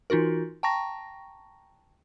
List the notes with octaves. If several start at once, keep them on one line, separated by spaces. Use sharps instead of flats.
E3 D#4 F4 F#4 A#4
G5 A5 A#5 C#6 A#6